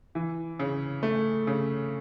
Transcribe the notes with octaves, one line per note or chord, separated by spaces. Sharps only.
E3
C#3
A3
C#3